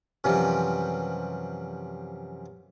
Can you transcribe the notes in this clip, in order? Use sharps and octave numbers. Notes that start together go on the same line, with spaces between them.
F#2 C3 E3 F3 G3